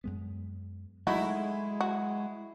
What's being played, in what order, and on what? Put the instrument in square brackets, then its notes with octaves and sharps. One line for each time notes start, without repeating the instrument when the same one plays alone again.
[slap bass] F#2 G#3 B3
[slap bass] F#3 [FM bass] G#3 [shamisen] A3 D#4 F#4 [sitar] E4
[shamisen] F#4